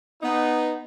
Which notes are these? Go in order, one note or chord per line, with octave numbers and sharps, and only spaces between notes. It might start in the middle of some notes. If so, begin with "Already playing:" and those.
B3 D#4